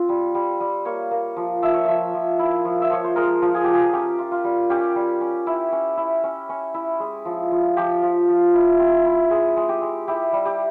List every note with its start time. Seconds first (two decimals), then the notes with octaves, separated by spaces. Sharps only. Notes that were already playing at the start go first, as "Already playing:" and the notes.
Already playing: C4 F4
0.09 G3
0.35 G3
0.60 G3
0.85 A#3 C#5
1.11 A#3
1.37 F3
1.62 F3 E5
1.74 C#5
1.85 F3 E5
2.14 F3
2.39 E4
2.65 F3
2.82 E5
2.90 F3 C#5
3.04 C5
3.16 G#3 A#4
3.42 F3
3.54 G#4
3.64 F3 G4
3.74 G#4
3.93 C#4 G4
4.19 F4
4.32 F4
4.44 G3
4.70 C#4 G4
4.96 G3
5.21 C#4
5.47 E4
5.72 C#4
5.97 E4
6.24 C#4
6.49 C#4
6.74 E4
7.00 G#3
7.25 F3
7.51 F3
7.77 F3 G4
8.03 F3
8.28 F3
8.54 E4
8.79 C4
9.05 E4
9.31 G#3 G#4
9.57 G#3
9.69 G4
9.81 G#3
10.08 E4 G4
10.33 G3
10.45 G4